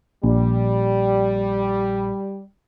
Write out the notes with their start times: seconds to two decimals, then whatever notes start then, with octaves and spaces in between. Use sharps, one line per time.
0.24 A#1 G3